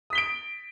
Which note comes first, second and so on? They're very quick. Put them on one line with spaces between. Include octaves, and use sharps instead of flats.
D#6 B6 G7 D7